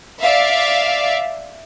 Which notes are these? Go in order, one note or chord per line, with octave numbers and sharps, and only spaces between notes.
D5 E5 F5